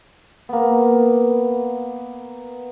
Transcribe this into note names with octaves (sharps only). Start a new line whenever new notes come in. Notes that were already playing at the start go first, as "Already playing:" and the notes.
A#3 B3